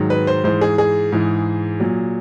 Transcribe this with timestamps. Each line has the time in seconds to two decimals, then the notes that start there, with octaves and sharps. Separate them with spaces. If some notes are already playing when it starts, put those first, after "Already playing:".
Already playing: G#2 D#3 F#3
0.10 B4
0.27 C5
0.44 G#2 E3 C5
0.61 G#4
0.78 G#4
1.12 G#2 E3
1.80 A#2 F#3